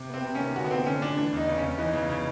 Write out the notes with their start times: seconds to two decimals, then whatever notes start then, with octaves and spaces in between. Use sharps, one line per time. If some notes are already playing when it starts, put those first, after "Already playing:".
Already playing: C3
0.09 B3 C4
0.25 C3
0.35 D#3 C#4
0.55 D3 F#4
0.64 B3
0.71 F3 C4
0.86 D3 C#4
1.02 A3 D4
1.17 E3 D4
1.32 E2 D#4
1.48 C#3
1.58 C#4
1.63 E2
1.78 E3 D#4
1.93 C#3
2.09 C#3